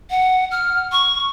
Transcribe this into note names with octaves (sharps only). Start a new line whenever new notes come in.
F#5
F6
C#6